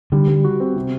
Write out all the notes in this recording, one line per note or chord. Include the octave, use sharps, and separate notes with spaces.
D3 G3
G3
F#4
C4
C3